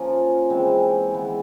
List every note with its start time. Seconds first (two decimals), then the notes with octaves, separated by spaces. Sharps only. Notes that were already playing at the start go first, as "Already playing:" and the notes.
Already playing: F3 A#3 C#4 F4
0.50 E3 G#3 C4
1.11 E3 G#3 B3